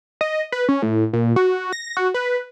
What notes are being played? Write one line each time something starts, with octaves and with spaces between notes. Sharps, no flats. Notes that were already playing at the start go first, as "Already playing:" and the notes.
D#5
B4
C#4
A2
A#2
F#4
A#6
F#4
B4